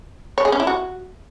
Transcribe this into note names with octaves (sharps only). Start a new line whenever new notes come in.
C#5
G#4
C#4
E4
F#4